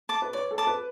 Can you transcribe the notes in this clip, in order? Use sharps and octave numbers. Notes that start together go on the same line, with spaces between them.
A5 D6
B4
C#5 D5
A4
A5 D6
B4